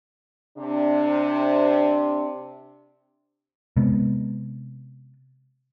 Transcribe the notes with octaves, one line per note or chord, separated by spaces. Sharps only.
C3 D4
C3 G#3 B3